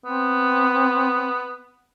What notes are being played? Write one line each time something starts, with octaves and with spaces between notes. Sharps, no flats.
B3 C4